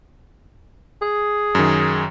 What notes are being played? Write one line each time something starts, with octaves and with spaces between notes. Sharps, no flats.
G#4
F#2 D#3